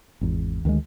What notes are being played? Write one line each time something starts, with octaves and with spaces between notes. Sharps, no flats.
G#1 E2
D2 D#3 F3 G#3